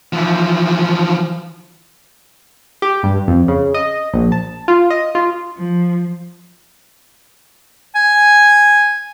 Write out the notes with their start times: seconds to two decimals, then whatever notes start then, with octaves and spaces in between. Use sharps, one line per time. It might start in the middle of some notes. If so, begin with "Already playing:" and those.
0.13 E3 F3
2.82 G4
3.03 G2
3.28 F2
3.48 C#3
3.74 D#5
4.14 A#1
4.32 A5
4.68 F4
4.90 D#5
5.15 F4
5.58 F3
7.95 G#5